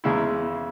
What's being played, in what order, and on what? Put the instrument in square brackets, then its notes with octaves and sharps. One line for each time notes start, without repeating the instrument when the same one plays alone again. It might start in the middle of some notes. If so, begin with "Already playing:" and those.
[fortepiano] E2 C#3 G#3 E4